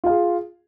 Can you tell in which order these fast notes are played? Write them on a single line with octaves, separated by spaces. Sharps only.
F4 F5 G#4